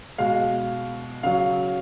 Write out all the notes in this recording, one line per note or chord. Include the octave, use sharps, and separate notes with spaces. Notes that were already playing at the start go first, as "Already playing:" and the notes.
B2 G#3 F5
C#3 F#3 F5